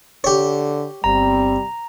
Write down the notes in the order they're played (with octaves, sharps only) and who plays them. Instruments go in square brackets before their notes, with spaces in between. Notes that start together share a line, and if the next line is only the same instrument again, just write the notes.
[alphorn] D3 [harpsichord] G4 C#5
[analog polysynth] G1 C4 [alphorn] G3 [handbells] A#5